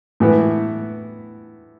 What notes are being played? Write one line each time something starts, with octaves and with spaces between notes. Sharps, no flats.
A2 E3 B3